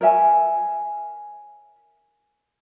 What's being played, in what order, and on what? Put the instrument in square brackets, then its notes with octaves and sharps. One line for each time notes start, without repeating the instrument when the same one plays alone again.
[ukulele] A#4 C#5 E5 G#5